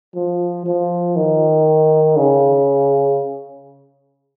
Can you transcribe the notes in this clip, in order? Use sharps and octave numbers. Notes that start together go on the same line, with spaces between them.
F3
F3
D#3
C#3